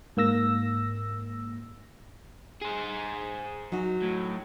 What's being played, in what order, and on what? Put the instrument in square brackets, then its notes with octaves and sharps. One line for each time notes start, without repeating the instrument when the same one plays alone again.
[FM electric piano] G#2 A#3 E6 A#6
[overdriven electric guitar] G#4 C5
[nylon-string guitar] F#3 D#4 F#4
[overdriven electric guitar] A2